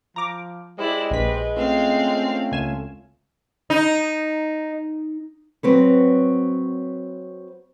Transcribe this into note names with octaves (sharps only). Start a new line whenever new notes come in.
F3 A#5 D6
G#3 E4 G4 C5 D5 D#5
A#1 B4 B6
A3 C4 C#4 F4 F5
C#2 G#5 E7
D#4
F#3 C4 B4 C#5